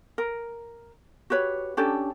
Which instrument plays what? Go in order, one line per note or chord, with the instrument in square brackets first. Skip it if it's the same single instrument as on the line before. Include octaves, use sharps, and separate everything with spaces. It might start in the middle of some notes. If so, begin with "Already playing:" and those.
[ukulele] A#4
F#4 G4 B4 C#5
C#4 D4 G4 A4